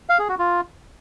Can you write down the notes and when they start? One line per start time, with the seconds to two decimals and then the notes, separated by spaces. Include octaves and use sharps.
0.09 F5
0.19 G#4
0.29 F#4
0.39 F4